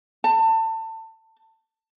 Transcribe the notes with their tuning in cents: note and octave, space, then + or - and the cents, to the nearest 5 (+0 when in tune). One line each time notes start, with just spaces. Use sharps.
A5 +25